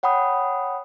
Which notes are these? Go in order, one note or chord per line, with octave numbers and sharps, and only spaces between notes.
C#5 F#5 G5 B5 D#6